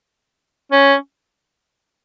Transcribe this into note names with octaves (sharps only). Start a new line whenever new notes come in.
C#4